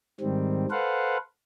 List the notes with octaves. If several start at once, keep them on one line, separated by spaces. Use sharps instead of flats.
G#2 D#3 G3 C4
A4 B4 C5 F5 F#5